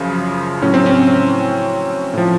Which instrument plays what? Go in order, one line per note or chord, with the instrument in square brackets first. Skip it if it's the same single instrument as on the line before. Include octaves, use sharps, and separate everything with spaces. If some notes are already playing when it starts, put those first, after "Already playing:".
Already playing: [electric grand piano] F#2 C#3 F3
A2 F#3 C#4
C4
C#4
A2 F3